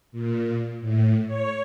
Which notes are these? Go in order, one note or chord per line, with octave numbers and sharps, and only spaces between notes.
A#2
A2
C#5